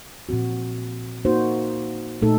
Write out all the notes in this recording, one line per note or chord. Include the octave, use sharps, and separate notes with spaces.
A#2 F3 C4 F#4
A#3 D#4 F#4 C5
A#2 A3 D#4 A4